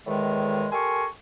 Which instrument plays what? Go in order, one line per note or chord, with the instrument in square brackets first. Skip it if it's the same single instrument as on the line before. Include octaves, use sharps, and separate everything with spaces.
[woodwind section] E2 A2 D#3 G#3
G4 A4 A#4 G#5 C6 C#6